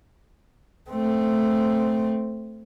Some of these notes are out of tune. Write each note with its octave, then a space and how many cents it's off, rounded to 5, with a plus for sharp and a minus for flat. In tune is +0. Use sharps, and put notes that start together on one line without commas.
A3 +0 C4 +0